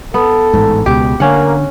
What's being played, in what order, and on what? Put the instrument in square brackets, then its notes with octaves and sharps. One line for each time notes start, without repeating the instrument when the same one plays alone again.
[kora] B3 [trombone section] A4
[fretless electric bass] A1 G#2
[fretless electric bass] C#2 B2 G#3 [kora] G4
[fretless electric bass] D3 [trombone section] A#3 [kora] C#4 F#5